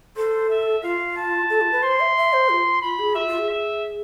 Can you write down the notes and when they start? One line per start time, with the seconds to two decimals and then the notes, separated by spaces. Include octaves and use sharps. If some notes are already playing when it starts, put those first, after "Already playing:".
0.17 A4 C5
0.49 E5
0.83 F4 F5
1.17 A5
1.50 A4
1.61 F4
1.72 B4
1.83 C5 C6
2.00 E5
2.17 E5
2.33 C5
2.49 F4
2.82 F4 B5
2.99 G#4
3.15 F4 E5
3.27 F4
3.38 G#4
3.49 E5